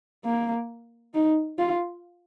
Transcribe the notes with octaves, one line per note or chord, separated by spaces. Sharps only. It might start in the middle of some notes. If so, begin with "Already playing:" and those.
A#3
D#4
F4